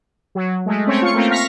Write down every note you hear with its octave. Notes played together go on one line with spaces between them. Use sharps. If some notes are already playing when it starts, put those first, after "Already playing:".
F#3
G#3 A3
A3 C4 C#4 C#5
F4 C#6 C#7
A3 A#3 C4 F4
F5 C#6 F6 A#6 B6